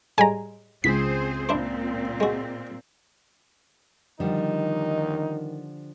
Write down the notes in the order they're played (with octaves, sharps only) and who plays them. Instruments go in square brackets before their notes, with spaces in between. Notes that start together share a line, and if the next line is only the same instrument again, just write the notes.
[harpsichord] A2 G3 G#3 [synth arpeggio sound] G#5 A#5
[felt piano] C#2 [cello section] C4 G#4 C5 [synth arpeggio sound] B6
[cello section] A#2 C4 [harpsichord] D4 E4 C5
[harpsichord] G#3 F#4
[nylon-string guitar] D3 F3 G3 [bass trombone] D#3 [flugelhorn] D#4